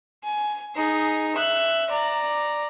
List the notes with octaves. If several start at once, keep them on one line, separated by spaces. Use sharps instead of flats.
G#5
D#4 G#4
E5 F#6
D5 A#5